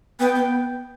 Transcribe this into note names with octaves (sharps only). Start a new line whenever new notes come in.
B3 G5
B3